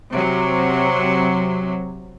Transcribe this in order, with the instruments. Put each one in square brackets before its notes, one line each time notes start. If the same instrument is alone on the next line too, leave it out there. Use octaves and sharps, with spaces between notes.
[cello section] C3 F#3